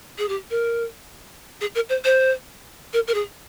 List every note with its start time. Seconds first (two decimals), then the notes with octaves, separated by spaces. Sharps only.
0.18 G#4
0.29 G4
0.50 A#4
1.61 G#4
1.75 A#4
1.89 C5
2.04 C5
2.93 A#4
3.07 A#4
3.14 G#4